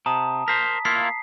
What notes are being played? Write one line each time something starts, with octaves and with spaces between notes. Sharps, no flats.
C3 A5 A#5 D#6
A#4 C5 B6
A#3 E4 F4 C7